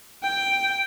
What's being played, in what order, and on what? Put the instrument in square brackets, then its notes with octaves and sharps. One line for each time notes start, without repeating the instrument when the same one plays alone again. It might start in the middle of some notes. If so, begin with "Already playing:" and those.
[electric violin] G5